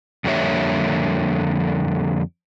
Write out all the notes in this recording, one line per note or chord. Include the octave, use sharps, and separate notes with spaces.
F2 D3 G3 A#3 C#5 E5